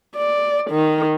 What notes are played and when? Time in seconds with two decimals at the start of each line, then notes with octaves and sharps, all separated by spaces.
0.16 D5
0.70 D#3